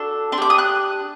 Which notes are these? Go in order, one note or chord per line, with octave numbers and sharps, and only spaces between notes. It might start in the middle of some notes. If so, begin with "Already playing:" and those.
Already playing: D4 F#4 A4
D4 C6
G4 D6
D#6
F#6